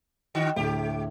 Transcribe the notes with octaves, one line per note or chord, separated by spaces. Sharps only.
D3 F#4 D#5
D2 A2 G#3 G4